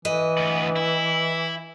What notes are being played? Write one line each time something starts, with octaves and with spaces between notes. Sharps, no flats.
E3 B4 D#5
D2 B3
E4